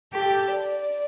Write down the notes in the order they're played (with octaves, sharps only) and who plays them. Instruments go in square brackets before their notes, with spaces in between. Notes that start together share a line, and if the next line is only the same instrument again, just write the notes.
[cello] G4 [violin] A4
[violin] D5